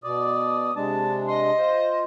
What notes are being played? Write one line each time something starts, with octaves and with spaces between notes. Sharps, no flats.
B2 D5 D#6
C3 G#3 D4 A5
D#5 C6
F4 C5